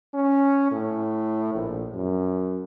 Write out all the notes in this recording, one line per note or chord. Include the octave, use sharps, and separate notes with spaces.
C#4
A2
A#1
F#2